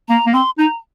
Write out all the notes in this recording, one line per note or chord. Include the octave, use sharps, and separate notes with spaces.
A#3 A#5
A#3
C4 C6
D#4 A#5